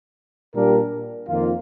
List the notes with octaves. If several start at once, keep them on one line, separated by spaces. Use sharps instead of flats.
A#2 G3 D4 G4 A#4
F2 D#3 A#3 F4